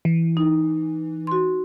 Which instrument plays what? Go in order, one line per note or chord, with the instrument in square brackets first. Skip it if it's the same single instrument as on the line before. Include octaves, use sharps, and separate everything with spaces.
[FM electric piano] E3
[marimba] D#4
F#4 C6